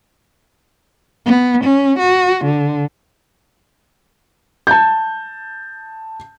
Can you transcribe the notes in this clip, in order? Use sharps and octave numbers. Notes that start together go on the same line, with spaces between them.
B3
C#4
F#4
D3
A5 G6